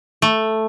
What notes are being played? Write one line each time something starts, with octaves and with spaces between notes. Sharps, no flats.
A3